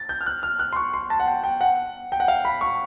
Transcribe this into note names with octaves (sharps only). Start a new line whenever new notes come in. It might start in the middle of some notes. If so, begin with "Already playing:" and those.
Already playing: A6
G6
F6
F#6
F6
F#6
C6
C#6
C6
A5
F#5
G5
G5
F#5
G5
F#5
F5
B5
C#6